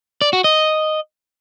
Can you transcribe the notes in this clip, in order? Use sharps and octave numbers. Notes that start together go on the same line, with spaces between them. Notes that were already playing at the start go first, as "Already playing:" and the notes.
D5
F#4
D#5